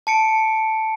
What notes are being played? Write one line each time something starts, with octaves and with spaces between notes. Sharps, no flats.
A5 C#7 D7